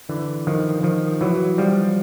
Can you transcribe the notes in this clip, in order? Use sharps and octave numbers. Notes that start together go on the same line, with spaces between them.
D3 E3
D#3 F3
D#3 F3
E3 F#3
F3 G3